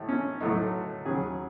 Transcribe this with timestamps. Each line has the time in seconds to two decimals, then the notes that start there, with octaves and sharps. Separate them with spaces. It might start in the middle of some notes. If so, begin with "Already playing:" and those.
Already playing: A1 A2 G#3
0.09 C#4
0.40 B1 A2 F#3 A3 D#4
1.06 D#2 C#3 F#3 G#4